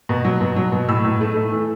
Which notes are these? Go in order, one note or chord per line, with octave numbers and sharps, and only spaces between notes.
B2
F#3
B2
F#3
B2
A2 E6
A2
A3
A3
E3